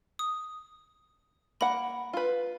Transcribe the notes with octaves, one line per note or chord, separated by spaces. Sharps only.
D#6
A#3 F#5 B5
F4 B4